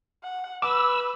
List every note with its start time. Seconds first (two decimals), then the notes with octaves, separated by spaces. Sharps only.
0.23 F#5
0.62 B4 D6 E6